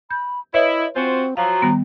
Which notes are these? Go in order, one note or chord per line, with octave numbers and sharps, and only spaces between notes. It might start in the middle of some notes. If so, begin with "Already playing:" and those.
B5 G6
E4 B4 C#5 D#5 E5
C4 F4 F#4 C5 G#5
F3 F#3 F5 A#5
D#3 G3 B3